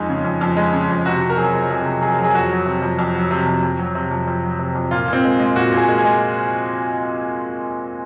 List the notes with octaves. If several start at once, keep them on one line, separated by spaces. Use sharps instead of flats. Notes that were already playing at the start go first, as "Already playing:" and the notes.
Already playing: F2 G#3 D#4
C#3
F2
F2
G#3
C#3
F2
C3 F#4
C3
A#4
F#3 G#4
F#3
C3 G#4
C3
F#3 G#4
F#3
G#4
F2 F#4
F#3
C3
F2
F2
F#3
C3
F2
F2
F#3
C3
F2
F2
F#3
C3
F2
A#2 F4
A#2 C4
G#3
G#3
A#2 F#4
A#2
G#4
G#3
G#4
G#3